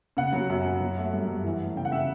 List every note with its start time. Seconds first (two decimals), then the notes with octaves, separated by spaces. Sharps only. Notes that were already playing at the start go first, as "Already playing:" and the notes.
0.17 C#3 F#5
0.33 F#3
0.50 F#2
0.65 F#2
0.81 F#3
0.98 A3
1.13 G2
1.29 G2
1.45 E3
1.60 A3
1.76 C#3 G5
1.85 F#5
1.92 C#3 E5